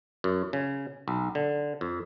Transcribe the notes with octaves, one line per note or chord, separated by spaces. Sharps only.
F#2
C#3
B1
D3
F2